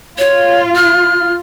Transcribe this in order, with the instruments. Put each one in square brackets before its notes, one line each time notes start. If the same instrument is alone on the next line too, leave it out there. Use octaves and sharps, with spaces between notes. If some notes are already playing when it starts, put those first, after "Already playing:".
[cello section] F4 [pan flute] C#5
[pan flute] F6